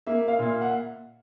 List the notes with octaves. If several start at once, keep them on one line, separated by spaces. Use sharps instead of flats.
A#3 E5
F5
A#2
F#5